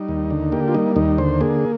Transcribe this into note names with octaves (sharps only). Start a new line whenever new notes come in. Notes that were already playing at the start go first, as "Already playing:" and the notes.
Already playing: G3 D#4
D#2
D3
A#3 G4
F4
G3 D#4
D#2 D#4
D3 C5
A#3 G#4